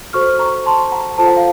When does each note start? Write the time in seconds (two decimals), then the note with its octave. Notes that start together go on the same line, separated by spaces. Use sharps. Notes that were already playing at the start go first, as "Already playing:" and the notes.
0.13 F#4 A4 C5 C#6 F6
0.39 A#5 C#6
0.66 A5 C6
0.92 F#5 A#5
1.18 F4 A4 C5 A5
1.27 F#5
1.37 F5